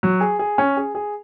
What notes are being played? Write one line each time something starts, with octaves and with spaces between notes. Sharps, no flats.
F#3
G#4
G#4
C#4
G#4
G#4